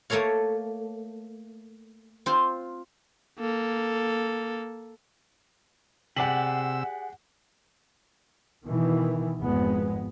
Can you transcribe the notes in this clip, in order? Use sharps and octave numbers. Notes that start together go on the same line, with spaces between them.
A3 A#3 A4 C#5 F5
C4 F4 C5
A#3 A4
C3 G4 G#4 D5 F#5 E6 F#7
B2 D#3 E3
G#1 F2 G#3 B3